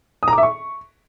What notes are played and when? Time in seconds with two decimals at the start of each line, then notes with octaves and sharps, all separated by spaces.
0.23 D#6
0.28 A#5
0.33 D6
0.38 E5
0.43 C#6